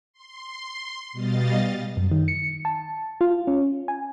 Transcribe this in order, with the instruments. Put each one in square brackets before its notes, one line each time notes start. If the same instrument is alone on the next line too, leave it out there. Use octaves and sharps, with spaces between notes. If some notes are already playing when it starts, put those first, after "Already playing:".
[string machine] C6
B2 G3 D#5 F5 A6
[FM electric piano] F#2
D#3
C#7
A5
F4
C#4
G#5